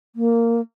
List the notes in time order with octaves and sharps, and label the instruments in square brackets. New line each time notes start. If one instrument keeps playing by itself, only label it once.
[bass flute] A#3